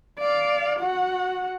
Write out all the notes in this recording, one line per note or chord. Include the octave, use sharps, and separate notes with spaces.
D5 F5
F#4 F#5